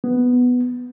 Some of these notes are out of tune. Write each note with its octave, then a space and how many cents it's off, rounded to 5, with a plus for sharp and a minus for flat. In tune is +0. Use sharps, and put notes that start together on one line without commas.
B3 +5